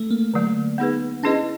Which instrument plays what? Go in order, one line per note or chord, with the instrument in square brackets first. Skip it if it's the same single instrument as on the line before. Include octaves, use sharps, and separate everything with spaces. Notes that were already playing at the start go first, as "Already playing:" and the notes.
Already playing: [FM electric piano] A3
A#3
[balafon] D3 F#3 A3
B3 D#4 G#4 B4
[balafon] C#4 E4 G#4 B4 D#5 [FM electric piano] D4